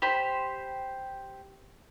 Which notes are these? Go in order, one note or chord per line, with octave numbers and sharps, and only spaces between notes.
G4 C5 B5